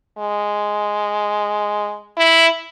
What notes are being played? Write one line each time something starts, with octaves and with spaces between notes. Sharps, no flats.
G#3
E4